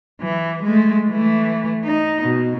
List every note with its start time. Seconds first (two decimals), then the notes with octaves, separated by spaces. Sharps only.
0.21 E3
0.63 G#3 A3
1.10 E3 A3
1.84 D#4
2.23 B2